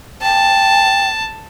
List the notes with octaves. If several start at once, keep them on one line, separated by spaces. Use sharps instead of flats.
G5 A5